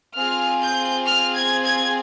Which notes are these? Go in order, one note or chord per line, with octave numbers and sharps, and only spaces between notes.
C4 F4 G#4 F6
G6
F6
G#6
G#6